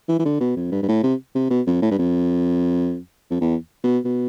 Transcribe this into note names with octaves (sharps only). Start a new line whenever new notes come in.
E3
E3
D3
B2
F2
G2
G2
A2
C3
C3
B2
F2
A2
G2
F2
F2
E2
B2
B2